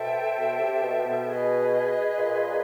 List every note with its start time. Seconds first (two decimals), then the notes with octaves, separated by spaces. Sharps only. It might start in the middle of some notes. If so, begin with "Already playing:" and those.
Already playing: B2 A4 C5 E5 G5
0.38 B2
0.60 C3
0.82 B2
1.05 B2
1.28 G#4 B4 D#5
2.17 A#2